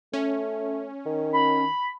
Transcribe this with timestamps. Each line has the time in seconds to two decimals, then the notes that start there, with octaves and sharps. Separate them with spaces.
0.13 A3 C#4
1.06 D#3
1.34 B5